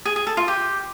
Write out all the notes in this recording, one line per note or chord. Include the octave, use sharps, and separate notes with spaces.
G#4
G#4
A4
F4
G4